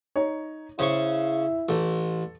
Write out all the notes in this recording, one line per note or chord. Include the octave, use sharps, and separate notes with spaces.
D#4 C#5
C#3 E4 C5 C#6
A1 A4